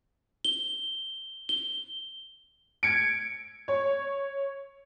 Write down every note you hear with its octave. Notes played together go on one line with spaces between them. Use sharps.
G7
G7
G#6 C#7 D7
C#5